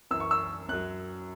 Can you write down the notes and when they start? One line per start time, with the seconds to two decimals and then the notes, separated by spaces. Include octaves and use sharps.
0.11 F#2 E3 E6
0.20 C#6
0.31 E6
0.69 F#2 F#3 F#6